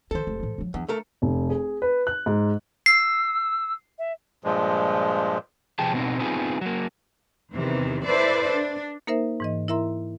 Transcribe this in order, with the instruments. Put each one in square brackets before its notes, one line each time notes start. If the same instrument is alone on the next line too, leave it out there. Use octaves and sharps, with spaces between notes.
[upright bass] D#3 E3 [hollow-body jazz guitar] A4 C5
[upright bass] F1 G#2
A2 E3
F3 F#3
[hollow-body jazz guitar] E2 [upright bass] D4
[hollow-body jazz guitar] A3 A4 A#4
[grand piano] F1
G#4
B4
F#6
G#2
[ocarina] E6 [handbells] C7
[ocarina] E5
[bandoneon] G2 A#2 F3 G#3
[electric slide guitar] C3 F3 G#4 G5 A5
B2 B3 C4 D#4
B3 C4 D#4 F4 G#4
F#3 A#3
[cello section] E2 C3 D#3 E3
E4 A4 B4 C5 D5 E5
D4
[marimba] A#3 D#4 A#4 C5 E5
G#2 E3 D#5
E4 A#4 E5 A#5 C6